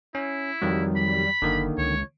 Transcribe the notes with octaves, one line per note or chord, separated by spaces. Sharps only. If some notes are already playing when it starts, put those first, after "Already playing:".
C#4 E4
F2 D#3 F#3 G3
B5
F#1 D3 D#3 A#3
C#2 C#5